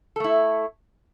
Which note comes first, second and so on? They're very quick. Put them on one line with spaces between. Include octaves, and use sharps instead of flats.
A4 A3 E4